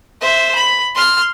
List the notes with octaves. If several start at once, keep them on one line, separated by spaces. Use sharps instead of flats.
C5 E5
B5
C6 F6